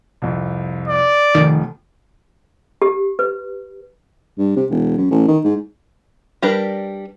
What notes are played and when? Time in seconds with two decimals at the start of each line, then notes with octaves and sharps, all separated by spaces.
0.22 C2 F2
0.88 D5
1.35 F1 F2 D#3
2.82 G4
3.19 B4
4.38 G2
4.56 C3
4.71 E1
4.98 F#2
5.11 A1
5.28 D#3
5.44 G#2
6.42 G3 D4 G4 A#4 B4